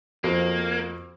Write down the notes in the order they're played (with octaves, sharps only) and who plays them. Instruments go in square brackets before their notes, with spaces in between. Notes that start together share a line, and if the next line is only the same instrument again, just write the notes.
[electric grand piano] F2 [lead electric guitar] A#3 [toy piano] F#4 C5 F5